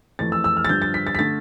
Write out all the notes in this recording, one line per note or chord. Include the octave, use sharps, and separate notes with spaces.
F2 E3 A3 A6
E6
E6
F6
A6
G2 D3 F3 G6
A6
B6
A6
B6
D3 A3 A6